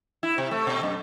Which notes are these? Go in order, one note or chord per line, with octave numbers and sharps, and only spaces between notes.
E4
C3
A3
B2
F#2